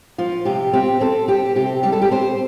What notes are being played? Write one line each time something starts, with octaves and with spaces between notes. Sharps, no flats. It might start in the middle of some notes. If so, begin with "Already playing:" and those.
F3 F4
C3 G4
C4 G4
C4 A4
C4 G4
C3 G4
G3 G4
A4
G4
C4 C5